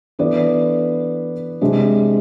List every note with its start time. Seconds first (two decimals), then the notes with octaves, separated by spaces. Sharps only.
0.19 E3 B3 D4 A4 D5
1.61 C3 G#3 D4